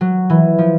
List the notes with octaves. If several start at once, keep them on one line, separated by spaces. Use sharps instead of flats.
F#3
E3
F3